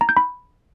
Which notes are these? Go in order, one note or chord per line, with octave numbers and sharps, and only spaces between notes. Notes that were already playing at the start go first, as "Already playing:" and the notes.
A#5
G6
B5